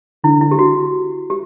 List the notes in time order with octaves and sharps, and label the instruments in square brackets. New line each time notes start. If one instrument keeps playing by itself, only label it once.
[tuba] D3 [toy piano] E4
[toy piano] E4
G4
F#4
G4